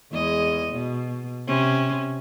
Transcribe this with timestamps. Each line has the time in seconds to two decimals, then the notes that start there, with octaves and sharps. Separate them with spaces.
0.12 E2 G#3 D#5
0.73 B2
1.48 C3 C#4